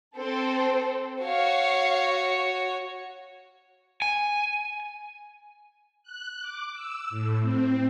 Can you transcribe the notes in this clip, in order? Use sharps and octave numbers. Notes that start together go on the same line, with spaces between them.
C4 A4 C5
F#4 C#5 F5
G#5
F#6
D6
E6
A2
C4